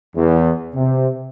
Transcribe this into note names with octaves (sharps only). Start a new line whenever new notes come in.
E2
C3